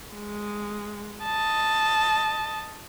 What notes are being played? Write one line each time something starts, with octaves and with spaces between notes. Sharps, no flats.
G#3
D#5 A5